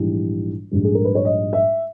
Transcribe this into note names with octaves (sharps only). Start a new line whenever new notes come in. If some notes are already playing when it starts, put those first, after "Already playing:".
Already playing: A#1 G#2 E3 G3
A#1 G#2 G3
G#4
A#4
B4
C#5
D#5
E5